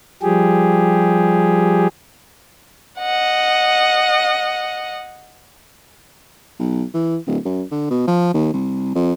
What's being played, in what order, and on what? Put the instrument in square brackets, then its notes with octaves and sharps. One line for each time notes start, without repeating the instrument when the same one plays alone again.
[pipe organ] F3 G3 G4 G#4
[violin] D#5 F#5
[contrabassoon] B1
E3
D1
F#2
D3
B2
F3
D#2
C2
F2